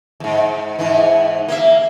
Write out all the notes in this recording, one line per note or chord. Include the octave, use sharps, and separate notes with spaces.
E2 G#2
G#2 E3
A#3 E5